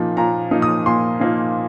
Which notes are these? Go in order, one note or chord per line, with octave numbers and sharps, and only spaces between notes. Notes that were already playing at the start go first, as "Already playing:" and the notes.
Already playing: A#2 F3 A#3 D#4
A#2 A#5
F3 A#3 D#4
D#6
A#2 C6
F3 A#3 D#4